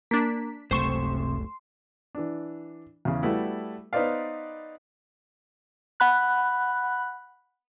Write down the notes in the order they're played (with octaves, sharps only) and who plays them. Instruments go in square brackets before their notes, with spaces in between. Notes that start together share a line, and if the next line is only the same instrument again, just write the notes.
[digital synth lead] A#3 [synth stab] D4 B6
[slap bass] F#1 C#2 A3 [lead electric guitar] C3 [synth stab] C5 C#6 E7 [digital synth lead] C6
[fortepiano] E3 D4
E2 C#3
G3 A3 B3 E4 F#4
B3 D#4 B4 C5 D5 F5
[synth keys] F#5 B5 F#6